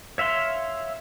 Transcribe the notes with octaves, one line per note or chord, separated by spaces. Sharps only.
C#5 E5 F5 C6